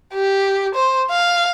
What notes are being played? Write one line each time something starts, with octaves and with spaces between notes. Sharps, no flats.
G4
C5
F5